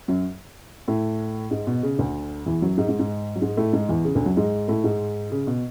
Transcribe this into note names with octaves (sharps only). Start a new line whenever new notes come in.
F#2 F#3
A2 A3
G#2 G#3
B2
C#3
D2 D3
E2 E3
F#2 F#3
G#2 G#3
G#2 G#3
G#2 G#3
F#3
G#2 G#3
A2 A3
G#2 G#3
E2 E3
C#3
D2 D3
F#2 F#3
G#2 G#3
A2 A3
G#2 G#3
C#3
B2